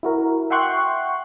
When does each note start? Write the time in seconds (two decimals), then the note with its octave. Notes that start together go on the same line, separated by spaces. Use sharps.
0.03 E4 F#4 A#4
0.50 E5 F#5 G5 C6 C#6 F#6